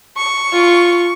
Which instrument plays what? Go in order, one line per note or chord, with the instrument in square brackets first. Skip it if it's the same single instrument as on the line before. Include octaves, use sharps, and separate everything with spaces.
[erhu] C#6
[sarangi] F4